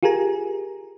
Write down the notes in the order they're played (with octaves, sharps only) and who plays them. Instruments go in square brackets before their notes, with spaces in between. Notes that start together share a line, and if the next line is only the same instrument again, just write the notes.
[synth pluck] F4 G4 G#4 A#4 G#5 A#5